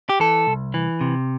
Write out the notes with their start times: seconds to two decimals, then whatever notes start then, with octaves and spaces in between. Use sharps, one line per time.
0.09 G4
0.20 E3 A4
0.47 C2
0.74 E3
1.01 C3